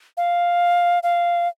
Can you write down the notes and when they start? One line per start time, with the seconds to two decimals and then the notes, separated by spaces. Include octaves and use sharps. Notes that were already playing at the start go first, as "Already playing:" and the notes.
0.17 F5
1.03 F5